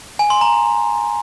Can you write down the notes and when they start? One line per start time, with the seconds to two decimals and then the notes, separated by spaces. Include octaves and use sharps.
0.19 G#5
0.30 C6
0.41 A#5